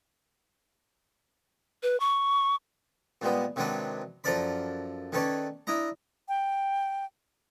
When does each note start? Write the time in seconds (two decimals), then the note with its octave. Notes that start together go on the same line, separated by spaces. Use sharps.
1.83 B4
2.00 C#6
3.22 A#2 G3 G#3 B3
3.56 C3 D#3 F#3 G#3 D4 B4
4.24 F#2 F3 A4 A#4 D5 B5
5.12 D#3 C#4 A4 B4 C#5 D5
5.67 D4 E4 D#5 A#5
6.28 G5